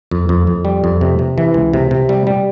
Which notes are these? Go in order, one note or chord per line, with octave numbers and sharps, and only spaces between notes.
F2
F2
F2
G3
F2
C3
C3
E3
C#2
C3
C3
G3
G3